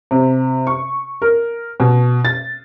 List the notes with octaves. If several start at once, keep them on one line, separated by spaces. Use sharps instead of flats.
C3
C#6
A#4
B2
A6